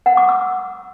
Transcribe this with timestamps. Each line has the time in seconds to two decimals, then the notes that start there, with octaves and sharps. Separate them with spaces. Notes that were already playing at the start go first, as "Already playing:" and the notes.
0.06 F#5
0.17 D6
0.29 E6